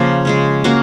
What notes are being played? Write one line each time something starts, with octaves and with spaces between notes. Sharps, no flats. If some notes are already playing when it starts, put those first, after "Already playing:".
Already playing: C#3 F3 A#3
C#3 G#3 C#4
A#3 C#4 F#4 A#4